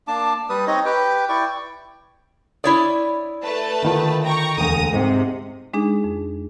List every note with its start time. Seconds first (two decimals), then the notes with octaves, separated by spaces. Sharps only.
0.08 A#3 D4 A5 D6
0.49 G3 B4 D#6
0.67 C4 D#4 C#5 D#5
0.85 G4 B4 G5
1.29 E4 D5 G5 C#6
2.64 E4 C#5 D5 D#6
3.44 A3 B4 A5
3.82 D3 D#3 F4
4.23 G5 A#5 C#6
4.57 E1 D2 A#5 D#6
4.93 G#2 C3
5.74 G#3 D4 D#4 G#4
6.04 F2